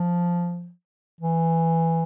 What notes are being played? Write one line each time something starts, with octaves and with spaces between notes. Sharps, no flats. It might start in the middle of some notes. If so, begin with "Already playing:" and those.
Already playing: F3
E3